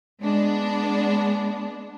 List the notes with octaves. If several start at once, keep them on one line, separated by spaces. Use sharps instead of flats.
G#3 B3 D4